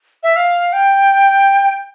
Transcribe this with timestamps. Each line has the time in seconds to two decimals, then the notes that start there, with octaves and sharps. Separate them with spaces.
0.23 E5
0.36 F5
0.73 G5